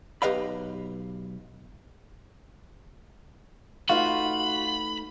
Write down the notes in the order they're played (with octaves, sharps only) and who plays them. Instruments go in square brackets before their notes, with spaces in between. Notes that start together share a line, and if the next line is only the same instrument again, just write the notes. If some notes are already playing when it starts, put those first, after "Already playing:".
[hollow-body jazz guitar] B1 G4 B4 D#5 F5 B5
[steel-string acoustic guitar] A3 D#4 B4 [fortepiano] F4 [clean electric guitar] F#4 [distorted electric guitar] B5